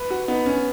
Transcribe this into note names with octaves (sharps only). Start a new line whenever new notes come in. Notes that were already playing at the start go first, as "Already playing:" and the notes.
Already playing: B4
F#4
B3 D#4
C#4